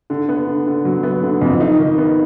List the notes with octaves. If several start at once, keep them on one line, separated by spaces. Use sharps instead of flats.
D3
B3
D3
D3
F#3
B3
D3
F2
D#4
D#3
B3